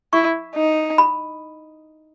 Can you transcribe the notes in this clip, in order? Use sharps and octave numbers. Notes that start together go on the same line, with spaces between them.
E4 C#6
D#4
B5